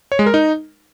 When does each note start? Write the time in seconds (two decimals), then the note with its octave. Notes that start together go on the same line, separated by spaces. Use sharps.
0.12 C#5
0.19 G#3
0.26 A#4
0.34 D#4